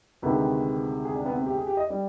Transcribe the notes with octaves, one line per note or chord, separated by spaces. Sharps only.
D2 C3 D#3 G#3 B4
G#4
D4
B3
C4
G4
G#4
G4
D#5
G3 D5